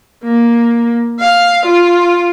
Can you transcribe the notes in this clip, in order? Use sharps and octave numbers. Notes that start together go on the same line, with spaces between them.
A#3
F5
F4